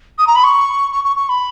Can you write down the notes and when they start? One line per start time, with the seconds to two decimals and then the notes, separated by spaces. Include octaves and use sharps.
0.18 D#6
0.27 A#5
0.35 B5
0.43 C#6
0.92 C#6
1.04 C#6
1.16 C#6
1.29 B5